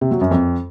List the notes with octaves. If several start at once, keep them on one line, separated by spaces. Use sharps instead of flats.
C3
F#3
F#2
F2